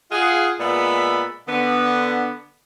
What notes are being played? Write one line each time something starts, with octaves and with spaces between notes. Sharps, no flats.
F4 G#4 F#5
A#2 G#3 B3 D5 E5 B5
D3 B3